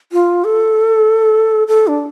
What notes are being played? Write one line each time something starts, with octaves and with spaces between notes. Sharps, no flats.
F4
A4
A4
D4